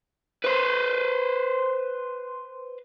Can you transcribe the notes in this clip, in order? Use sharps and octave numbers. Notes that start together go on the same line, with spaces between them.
B4 C5